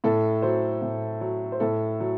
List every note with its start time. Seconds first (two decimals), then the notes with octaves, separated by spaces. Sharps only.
0.04 A2 A4
0.42 F#3 C5
0.82 A2
1.21 F#3
1.52 C5
1.60 A2 A4
2.00 F#3